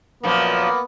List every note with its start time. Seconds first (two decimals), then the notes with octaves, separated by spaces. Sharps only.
0.23 F#2 A#2 F3 A#3 B3